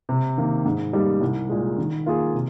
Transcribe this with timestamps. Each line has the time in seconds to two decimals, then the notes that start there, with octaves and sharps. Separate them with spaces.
0.09 C3
0.38 D#3 A#3
0.66 G#2
0.93 G3 A#3 D#4 G4
1.21 C2
1.49 A#2 G#3
1.78 D#3
2.06 A#3 F4 G#4
2.34 C3